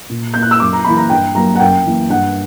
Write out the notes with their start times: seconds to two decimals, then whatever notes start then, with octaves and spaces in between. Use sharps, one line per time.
0.09 A#2
0.34 A#3 G6
0.42 F#6
0.51 E6
0.60 F#2 D6
0.73 A#5
0.85 E3 A#3 B5
0.97 A#5
1.10 G2 G5
1.35 F#3 A#3 A#5
1.55 F#5
1.60 F#2 G5
1.85 E3 A#3
2.10 G2 F#5